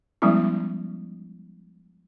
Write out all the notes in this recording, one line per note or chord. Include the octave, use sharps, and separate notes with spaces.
F3 G3 G#3 B3 C#4 E4